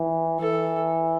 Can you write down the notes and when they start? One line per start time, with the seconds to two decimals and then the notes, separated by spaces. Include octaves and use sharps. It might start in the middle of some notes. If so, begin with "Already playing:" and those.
Already playing: E3
0.40 E3 A4